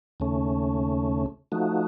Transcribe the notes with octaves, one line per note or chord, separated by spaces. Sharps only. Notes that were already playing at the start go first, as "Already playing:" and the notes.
D#2 C#3 A3 C#4
F3 A3 D#4 F#4